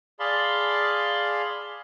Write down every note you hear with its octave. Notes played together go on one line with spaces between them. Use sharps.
G#4 D5 F5 A5 B5 C6